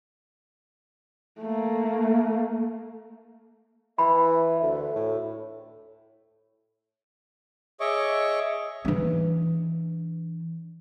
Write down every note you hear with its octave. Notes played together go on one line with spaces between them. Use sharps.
A3 A#3
E3 E5 B5
D2 A4
A2
G#4 C#5 D#5 E5 C#6 D6
E3 D4